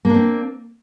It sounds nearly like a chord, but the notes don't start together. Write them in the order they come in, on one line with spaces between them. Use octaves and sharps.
A#3 D4 C4